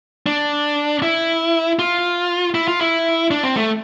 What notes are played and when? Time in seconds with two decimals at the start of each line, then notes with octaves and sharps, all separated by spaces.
0.26 D4
1.02 E4
1.79 F4
2.55 E4
2.68 F4
2.81 E4
3.31 D4
3.44 C4
3.57 A3